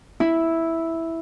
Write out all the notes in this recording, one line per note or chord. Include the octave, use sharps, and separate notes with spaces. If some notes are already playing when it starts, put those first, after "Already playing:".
E4